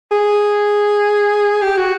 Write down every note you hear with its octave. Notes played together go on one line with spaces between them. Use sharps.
G#4
G4
F#4